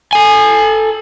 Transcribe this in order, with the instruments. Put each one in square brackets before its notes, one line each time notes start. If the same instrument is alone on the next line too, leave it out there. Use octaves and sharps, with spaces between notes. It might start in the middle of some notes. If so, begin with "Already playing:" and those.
[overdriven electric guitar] A4 G#5